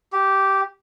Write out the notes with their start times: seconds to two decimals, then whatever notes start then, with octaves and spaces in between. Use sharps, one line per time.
0.13 G4